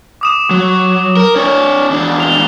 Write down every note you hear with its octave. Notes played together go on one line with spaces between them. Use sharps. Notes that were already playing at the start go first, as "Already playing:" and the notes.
D6 D#6 E7
F#3
A#4
D4 C#5
E2 D4
F7 G7